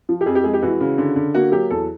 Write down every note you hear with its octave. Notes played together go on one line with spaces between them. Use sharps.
F3
G4
F2 G#4
G4
G#3 G#4
G4
E3 F#4
C#3
D3
D3
A#3 F#4
F#3 G4
E2 A4